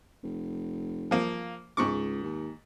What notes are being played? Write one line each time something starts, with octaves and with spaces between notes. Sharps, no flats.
F1
F3 A#3
C#2 G#2 C#6 D6
D#2